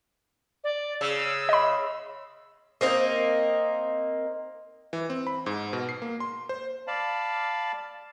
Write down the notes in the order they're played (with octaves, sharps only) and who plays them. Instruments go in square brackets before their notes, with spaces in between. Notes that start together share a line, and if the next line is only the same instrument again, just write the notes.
[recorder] D5
[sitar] C#3 [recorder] E6
[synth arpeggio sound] D#5 B5
[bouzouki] A#3 C4 D#4
[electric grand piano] E3
C4
B5
G#2
B2
C7
A#3
C6
C5
[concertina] D5 F5 A5 B5